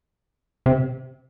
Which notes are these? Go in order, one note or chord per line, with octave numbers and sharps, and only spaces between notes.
C3